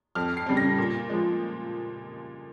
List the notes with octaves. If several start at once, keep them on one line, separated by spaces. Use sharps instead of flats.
F2 F6
C7
C#3 G3 C4
A#6
A#2
F3 G#3